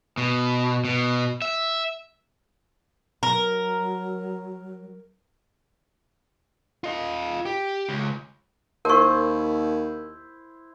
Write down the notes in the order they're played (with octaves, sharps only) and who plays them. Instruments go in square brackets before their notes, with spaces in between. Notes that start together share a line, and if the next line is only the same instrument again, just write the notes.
[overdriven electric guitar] B2
B2
E5
[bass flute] F#3 [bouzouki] A#4
[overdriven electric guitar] F4 D#5
G4
C#2
[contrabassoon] D#2 [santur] E4 C5 [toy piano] A#4 C#6